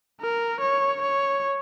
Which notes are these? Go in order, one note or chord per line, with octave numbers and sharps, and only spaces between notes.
A#4
C#5
C#5